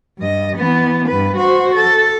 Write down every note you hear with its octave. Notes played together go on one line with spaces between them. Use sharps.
G2 D#5
E3 B3
G2 B4
F#4 C5
A4